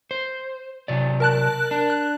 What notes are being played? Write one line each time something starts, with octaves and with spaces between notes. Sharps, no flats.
C5
C3 F#3 D5
A#4 A5 F#6
D4
F#6